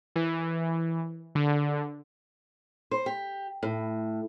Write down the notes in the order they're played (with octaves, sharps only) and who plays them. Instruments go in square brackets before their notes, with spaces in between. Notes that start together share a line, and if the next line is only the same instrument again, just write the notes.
[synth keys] E3
D3
[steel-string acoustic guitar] C5
G4
A2